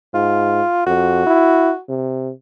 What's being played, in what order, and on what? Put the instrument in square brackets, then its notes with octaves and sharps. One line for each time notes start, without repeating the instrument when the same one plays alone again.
[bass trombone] G#2 [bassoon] F4
[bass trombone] F2 [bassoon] F#4
[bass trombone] E4
C3